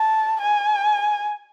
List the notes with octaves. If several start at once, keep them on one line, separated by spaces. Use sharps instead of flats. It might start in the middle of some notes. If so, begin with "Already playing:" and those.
Already playing: A5
G#5